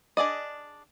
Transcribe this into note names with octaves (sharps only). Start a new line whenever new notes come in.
D4 G#4 D5 D#5